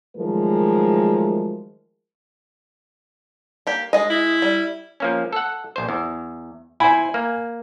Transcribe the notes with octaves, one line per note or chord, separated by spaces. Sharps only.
D#3 F3 F#3 G#3 A3 A#4
A#3 G4
G#3 D#5
E4
G3
F3 A#3 C#4
A4 F#5
A#1 C5
E2
E4 C5 G#5 B5
A#3